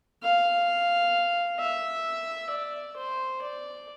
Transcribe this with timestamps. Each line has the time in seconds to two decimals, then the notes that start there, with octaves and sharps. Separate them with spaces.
0.23 F5
1.59 E5
2.50 D5
2.96 C5
3.42 D5